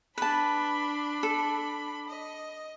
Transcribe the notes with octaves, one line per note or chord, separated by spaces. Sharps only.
D4 B4 A5 B5
A4
D#5